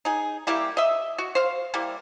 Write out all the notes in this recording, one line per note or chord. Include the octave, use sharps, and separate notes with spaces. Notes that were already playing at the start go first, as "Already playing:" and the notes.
D#4 G#4
G3 A#3 E4 G4
D#5 E5
F#4
C5 F5
G3 A#3 E4